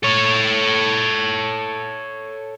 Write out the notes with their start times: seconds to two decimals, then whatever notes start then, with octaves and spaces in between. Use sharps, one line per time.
0.03 A4 C#5